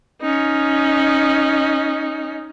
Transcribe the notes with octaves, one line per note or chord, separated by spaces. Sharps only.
C#4 D#4